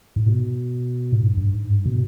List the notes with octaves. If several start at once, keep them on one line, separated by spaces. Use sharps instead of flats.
G#2
B2
G#2
G2
G2
G#2
G2
B2